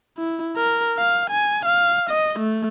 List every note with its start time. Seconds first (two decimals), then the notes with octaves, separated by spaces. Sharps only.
0.18 E4
0.57 A#4
0.98 F5
1.30 G#5
1.65 F5
2.10 D#5
2.39 A3